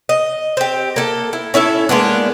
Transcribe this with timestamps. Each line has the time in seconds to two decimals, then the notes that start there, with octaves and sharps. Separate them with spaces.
0.09 D#5
0.57 C4 G4
0.96 A#3 A4
1.33 E4
1.54 C#4 E4 A4 E5
1.89 G#3 A#3 B3 D4